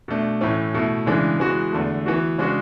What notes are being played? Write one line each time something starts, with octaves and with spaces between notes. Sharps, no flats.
B2 A3 D4
A2 E3 A3 C#4
B2 A3 E4
C#3 E3 G#3 D4
E3 G#3 B3 F#4
E2 D3 A3
E3 B3 F#4
C#3 G#3 D4 F#4